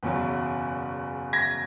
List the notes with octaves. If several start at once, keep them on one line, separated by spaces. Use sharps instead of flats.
F#1 E2 B2 F#3
G#6 A#6